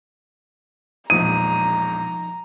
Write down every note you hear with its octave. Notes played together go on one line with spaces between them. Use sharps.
E1 A#1 F3 D#4 A#5 D#6 D#7